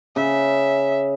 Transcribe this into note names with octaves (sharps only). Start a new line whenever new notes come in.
C#3 E5